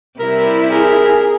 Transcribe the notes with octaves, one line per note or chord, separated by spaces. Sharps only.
C3 G3 E4 A#4
G#4 A#4